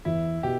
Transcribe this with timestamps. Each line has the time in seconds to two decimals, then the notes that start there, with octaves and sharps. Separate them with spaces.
0.05 E2 E4
0.43 B2 G4